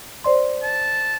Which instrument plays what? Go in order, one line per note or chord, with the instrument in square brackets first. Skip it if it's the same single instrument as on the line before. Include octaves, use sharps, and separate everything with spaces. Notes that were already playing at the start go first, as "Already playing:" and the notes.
[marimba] C5 D5 C6
[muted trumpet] A5